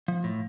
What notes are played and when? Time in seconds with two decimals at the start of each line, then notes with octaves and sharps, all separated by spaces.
0.08 F3
0.24 A2